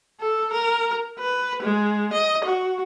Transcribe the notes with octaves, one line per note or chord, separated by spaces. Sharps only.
A4
A#4
B4
G#3
D#5
F#4